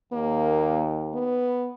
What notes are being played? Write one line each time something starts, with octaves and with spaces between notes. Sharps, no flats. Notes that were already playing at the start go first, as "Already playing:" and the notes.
D#2 A#3
B3